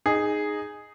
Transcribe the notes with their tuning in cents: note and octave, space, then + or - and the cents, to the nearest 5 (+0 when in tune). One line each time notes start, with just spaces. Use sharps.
D#4 -10 G#4 +0